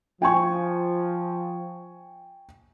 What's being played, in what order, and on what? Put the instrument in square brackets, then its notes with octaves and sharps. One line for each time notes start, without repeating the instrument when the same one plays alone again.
[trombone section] F3 [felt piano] G5 G#5 C#6